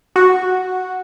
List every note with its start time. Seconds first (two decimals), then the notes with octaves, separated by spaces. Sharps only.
0.16 F#4